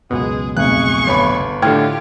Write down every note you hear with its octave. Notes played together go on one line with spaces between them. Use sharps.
C#2 F#2 B2 G#3 G#4
F1 B1 G#4 C#6 F#6
G1 C#5 B5
A2 D3 F4 G4 G5 F6 G#6